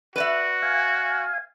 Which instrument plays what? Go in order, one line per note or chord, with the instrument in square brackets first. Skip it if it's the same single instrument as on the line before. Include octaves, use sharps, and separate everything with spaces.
[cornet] F#4 [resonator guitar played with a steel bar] B4 D5 E5
[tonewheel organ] F5 G#5